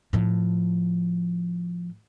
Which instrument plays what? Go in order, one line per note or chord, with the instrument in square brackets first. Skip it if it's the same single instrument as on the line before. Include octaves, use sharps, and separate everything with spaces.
[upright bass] A2 F3